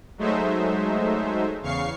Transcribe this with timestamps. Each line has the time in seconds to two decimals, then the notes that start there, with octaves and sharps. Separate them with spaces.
0.18 F#3 G#3 A3 D#4 C5 E5
1.61 E2 C#3 F5 C#6 C7